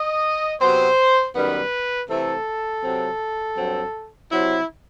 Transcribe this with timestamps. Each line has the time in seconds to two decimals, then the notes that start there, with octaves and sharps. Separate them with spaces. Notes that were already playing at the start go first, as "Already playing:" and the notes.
Already playing: D#5
0.61 C3 F#3 B3 C5
1.35 F#2 D#3 G3 B3 B4
2.09 C3 E3 A3 C4 A4
2.84 C3 F#3 C4
3.58 G2 F#3 C4
4.31 C3 F#3 C4 E4